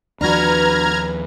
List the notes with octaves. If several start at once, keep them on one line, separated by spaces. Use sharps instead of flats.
D#2 F3 D4 F#4 B4 A#5 F6 G#6